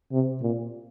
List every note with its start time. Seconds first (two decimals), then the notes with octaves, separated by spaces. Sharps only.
0.12 C3
0.42 A#2